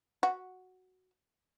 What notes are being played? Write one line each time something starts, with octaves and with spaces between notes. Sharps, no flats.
F#4